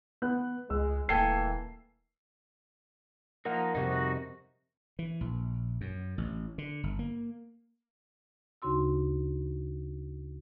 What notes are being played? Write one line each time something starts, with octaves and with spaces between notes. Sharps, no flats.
B3 F#6
C#2 G#3 D#5 E6
D#1 E3 A3 A#3 A4 G5 G#5 C7
F3 A#3 D#4 A#4 F#5
F2 C3 G3 D#4 F#4
E3
A#1
F#2
A1
D3
G1
A#3
D2 C#3 D#4 F#4 C6 E6